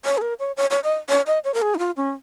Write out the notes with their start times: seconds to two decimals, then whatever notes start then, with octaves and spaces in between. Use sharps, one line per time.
0.05 C#5
0.18 G#4
0.21 A#4
0.40 C#5
0.57 C#5
0.71 C#5
0.84 D#5
1.09 C#5
1.27 D#5
1.44 C#5
1.54 A#4
1.62 G#4
1.75 D#4
1.79 F4
1.97 C#4